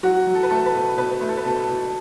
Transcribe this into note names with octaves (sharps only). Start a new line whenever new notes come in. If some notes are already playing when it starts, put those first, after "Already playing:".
F#3 F#4
F#3
A4
B4
A3 A4
B4
B2
B2 B4
A3
A4
B4
B2 A4
A4
B2